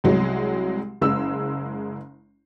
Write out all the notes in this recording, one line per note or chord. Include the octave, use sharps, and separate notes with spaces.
C2 F#3 G#3
F#1 G#3 E6